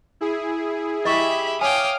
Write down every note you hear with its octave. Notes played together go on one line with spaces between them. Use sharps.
E4 G#4
G4 D#5 E5 B5 C#6
C#5 F5 G5 G#5 D6 D#6 F6